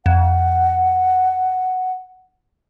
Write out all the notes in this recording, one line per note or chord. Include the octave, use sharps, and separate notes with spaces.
F2 F#5